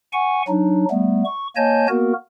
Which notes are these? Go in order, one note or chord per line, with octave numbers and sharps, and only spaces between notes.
F#5 G#5 C#6
F#3 D4 D#4
G3 A3 B3
C#6
A#3 C#5 D#5 G#5 A5 G6
A#3 B3 F#4 A#4